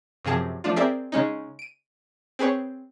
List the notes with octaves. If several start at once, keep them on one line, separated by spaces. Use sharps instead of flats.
F#2 C3 F3 G#4 A5
F3 A3 D4 F4
C4 G#4 A#4 D5 E5 C7
C#3 G#3 C#4 D#4
D7 D#7
C4 G#4 B4 C#5